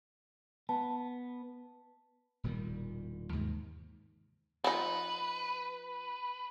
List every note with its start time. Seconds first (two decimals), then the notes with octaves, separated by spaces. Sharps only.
0.69 B3 A5
2.44 E1 A#2 D#3 G3
3.33 D#2 G#2 C3
4.64 F3 D#4 B4